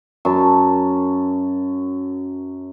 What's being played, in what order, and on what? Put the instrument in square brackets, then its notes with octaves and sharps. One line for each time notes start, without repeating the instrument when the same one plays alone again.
[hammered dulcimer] F#2 A5